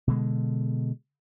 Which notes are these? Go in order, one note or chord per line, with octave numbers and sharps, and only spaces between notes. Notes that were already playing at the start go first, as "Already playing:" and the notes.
B2 D3 G#3